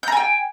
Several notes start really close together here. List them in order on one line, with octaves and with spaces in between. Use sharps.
G6 A#5 G#5 G5